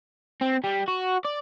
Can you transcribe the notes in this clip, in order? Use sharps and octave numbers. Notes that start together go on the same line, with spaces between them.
C4
G3
F#4
D5